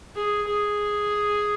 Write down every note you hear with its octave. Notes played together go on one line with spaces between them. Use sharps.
G#4
G#4